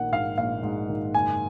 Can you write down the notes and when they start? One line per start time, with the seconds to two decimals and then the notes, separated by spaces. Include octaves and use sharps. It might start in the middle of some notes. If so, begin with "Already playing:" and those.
Already playing: A#1 D#3 F#5
0.12 G#2 F5
0.38 A#1 F5
0.63 G#2
0.89 D#3
1.14 F#1 G#5